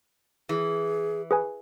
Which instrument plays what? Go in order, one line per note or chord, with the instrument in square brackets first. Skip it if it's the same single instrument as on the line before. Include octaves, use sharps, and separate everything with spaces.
[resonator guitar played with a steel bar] E3 [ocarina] G#4
[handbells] G#4 B4 G#5